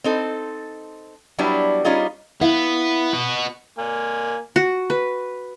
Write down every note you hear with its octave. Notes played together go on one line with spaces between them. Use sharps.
C4 D#4 A4
F#3 G3 B3 D4 E4
G3 C#4 D#4 F4 G#4
B3 E4 E5 F5
B3 F#4
A#3 G#5
F#4
B4